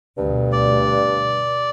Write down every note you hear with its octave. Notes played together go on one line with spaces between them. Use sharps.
D2 G2 B2
D5